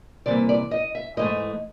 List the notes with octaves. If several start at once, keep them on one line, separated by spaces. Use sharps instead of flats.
C3 E3 G3 A#3 D5
D5
D#5
E5
G#2 E3 A3 D#5